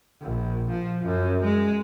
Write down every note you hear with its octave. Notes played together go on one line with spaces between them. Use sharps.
A#1
F3
F#2
G#3